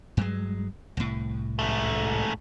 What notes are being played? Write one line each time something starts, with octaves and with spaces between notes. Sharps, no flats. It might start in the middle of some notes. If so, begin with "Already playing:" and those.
G2 F#3 G#3
C2 A2
G#2 A3